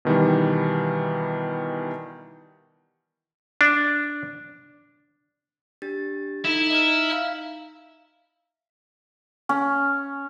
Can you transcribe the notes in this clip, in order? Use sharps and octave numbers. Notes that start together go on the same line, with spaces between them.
B2 D#3 E3 G3
D4
D4 G4 A6
D#4 E4 A4 E5
D#5 A#5 F6
E5 F5
C#4